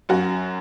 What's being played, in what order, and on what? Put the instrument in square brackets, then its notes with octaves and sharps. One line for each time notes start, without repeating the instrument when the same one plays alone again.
[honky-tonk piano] F#2 F#4